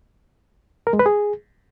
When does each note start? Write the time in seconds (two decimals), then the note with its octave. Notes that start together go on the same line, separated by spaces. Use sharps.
0.87 A#4
0.93 G#3
0.99 B4
1.06 G#4